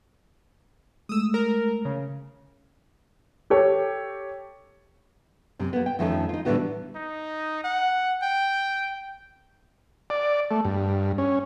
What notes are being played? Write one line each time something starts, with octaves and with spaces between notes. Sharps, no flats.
G#3 A3 D#6 E6
A#4
C#3
G4 A4 C#5
F#2 C3
A#3 B3
G5
F2 D#3 F3 A3 C#4 A4
D#4 F4
A2 D3 E3 G3 B3 F#4
D#4
F#5
G5
D5
A3
G2
C#4